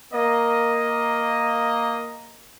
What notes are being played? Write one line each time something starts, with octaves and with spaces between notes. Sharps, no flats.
A#3 D#5